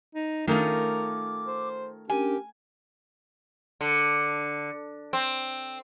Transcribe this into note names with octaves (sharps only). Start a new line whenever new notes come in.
D#4
D#3 A3 C#4 F4 A#4 D6
C5
C#4 D4 G4 A#4 G#5
D3
C4